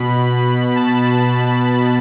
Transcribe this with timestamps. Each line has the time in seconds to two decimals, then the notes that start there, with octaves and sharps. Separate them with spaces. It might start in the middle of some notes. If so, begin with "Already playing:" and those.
Already playing: B2 B5
0.26 B5
0.76 A5
1.26 A5